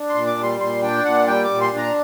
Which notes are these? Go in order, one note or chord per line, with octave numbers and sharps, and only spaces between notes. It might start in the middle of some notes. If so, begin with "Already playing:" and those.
Already playing: D4
C6
A#2
D6
G3
C6
A#2 C6
D4 G5
A#2 F#5
G3 G5
D6
A#2
C6
D4
A#5